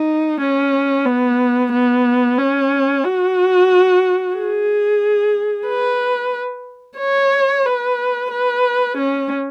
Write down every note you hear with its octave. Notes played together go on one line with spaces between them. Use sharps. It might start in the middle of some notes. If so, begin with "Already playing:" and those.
Already playing: D#4
C#4
B3
B3
C#4
F#4
G#4
B4
C#5
B4
B4
C#4